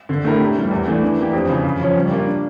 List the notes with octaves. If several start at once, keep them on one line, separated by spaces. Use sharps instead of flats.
D3
A3 E4 G4 A#4
A2
E3 G3
E2
E3 A3 D4
E3
A#3 D4 G4
F2
C#3 E3
C#3
F3 C#4
G3
A#3 D4 F4 A#4